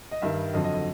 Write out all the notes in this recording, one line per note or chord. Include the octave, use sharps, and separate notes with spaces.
D#5
G2 D#3 G3 E5
F2 D3 F#3 D#5
D#5
D#5